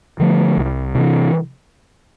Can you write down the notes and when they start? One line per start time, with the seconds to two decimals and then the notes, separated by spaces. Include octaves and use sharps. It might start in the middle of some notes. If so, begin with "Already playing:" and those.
0.19 D3 F3 A3
0.57 C2
0.95 C3 E3